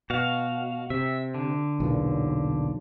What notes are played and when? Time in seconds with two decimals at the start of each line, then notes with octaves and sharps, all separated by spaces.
0.10 B2 F#4 F5
0.90 C3 E5
1.34 D3
1.80 B1 E2 A#2